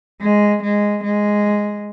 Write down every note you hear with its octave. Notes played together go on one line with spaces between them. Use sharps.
G#3
G#3
G#3